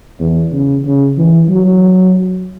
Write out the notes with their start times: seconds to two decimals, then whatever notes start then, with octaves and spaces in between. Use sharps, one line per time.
0.20 E2
0.53 C#3
0.85 C#3
1.18 E3
1.49 F#3